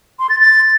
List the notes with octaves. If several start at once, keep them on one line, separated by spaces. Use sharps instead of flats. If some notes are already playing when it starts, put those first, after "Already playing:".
C6
A6
A6